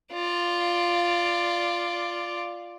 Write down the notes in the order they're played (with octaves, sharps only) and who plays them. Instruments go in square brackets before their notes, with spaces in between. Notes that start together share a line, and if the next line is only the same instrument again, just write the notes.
[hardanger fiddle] F4 D5